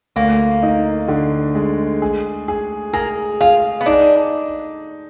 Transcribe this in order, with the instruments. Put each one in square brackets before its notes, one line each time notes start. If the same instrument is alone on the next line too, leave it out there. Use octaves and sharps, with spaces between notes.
[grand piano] D2 [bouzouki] A#3
[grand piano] D#4
D3
G#3
G#4
G#4
[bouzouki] A#3 [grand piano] G#4
[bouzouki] F4 [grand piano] G#4
[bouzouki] B3
[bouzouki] D4 [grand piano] D#4